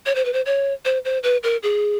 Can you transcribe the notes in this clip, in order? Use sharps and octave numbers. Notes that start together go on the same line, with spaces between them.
C#5
C5
B4
C5
C#5
C5
C5
B4
A#4
G#4